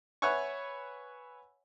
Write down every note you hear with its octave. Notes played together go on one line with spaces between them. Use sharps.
B4 C#5 E5 F#5 G#5 C#6